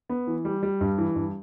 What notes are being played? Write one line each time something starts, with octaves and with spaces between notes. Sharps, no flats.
B3
E3
G3
G3
G2
E3
G2